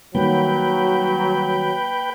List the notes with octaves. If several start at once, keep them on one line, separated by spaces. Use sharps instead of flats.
D#3 F#3 G3 A#3 B4 G5